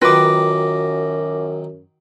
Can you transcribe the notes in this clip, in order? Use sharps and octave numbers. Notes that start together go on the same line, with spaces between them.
F#2 D#3 F#3 F4 B4 G5 D6 A#6